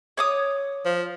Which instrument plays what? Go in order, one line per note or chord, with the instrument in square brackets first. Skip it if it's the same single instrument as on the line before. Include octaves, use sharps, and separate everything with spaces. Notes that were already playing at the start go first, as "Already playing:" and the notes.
[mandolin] C#5 D6 D#6
[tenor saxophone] F3